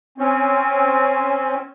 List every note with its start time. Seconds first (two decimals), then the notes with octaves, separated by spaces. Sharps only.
0.18 C4 C#4